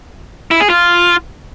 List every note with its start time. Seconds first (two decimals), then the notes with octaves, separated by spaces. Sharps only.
0.51 E4
0.60 G#4
0.70 F4